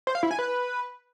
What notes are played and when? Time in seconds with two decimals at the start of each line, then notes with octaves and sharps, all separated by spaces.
0.07 C5
0.15 F5
0.23 E4
0.31 G#5
0.39 B4